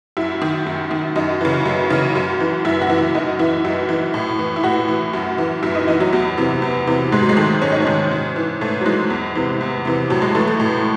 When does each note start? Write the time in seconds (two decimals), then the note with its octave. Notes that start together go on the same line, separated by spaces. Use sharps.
0.17 F#2 E4
0.42 D#3
0.66 F#2
0.91 D#3
1.16 F#2 D#4
1.41 C#3 E3
1.66 F#2
1.90 C#3 E3
2.15 F#2
2.40 E3
2.65 F#2 E4
2.81 F#4
2.90 E3
2.98 E4
3.15 F#2 D#4
3.39 E3 E4
3.64 F#2 E4
3.89 E3
4.14 A2
4.39 E3
4.56 E4
4.63 A2 F#4
4.88 E3
5.13 F#2
5.38 E3
5.63 F#2 E4
5.75 D#4
5.88 E3 D#4
6.00 F#3
6.13 E2 F#3
6.38 C3 E3
6.62 E2
6.87 C3 E3
7.12 G#2 G#3
7.22 F#3
7.29 G#3
7.37 D#3 A3
7.62 G#2 C#4
7.72 D#4
7.82 D#3 C#4
8.11 G#2
8.36 E3
8.61 G#2 A3
8.81 F#3
8.86 E3 G#3
9.10 E2
9.35 C3 E3
9.61 E2
9.85 C3 E3
10.10 A2 F#3
10.22 G#3
10.35 E3 A3
10.47 A3
10.60 A2